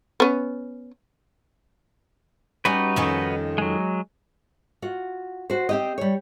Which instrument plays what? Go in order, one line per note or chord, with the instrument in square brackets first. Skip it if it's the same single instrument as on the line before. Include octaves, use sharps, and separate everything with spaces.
[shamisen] B3 C#4
[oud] G3 C#4 [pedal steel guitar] D#4 F#4 B4
[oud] F2 D#3 C#4
[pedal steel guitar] F#3 G#3
[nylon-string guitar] F4 F#4
F#4 C5
C4 G4 D#5
G3 C#5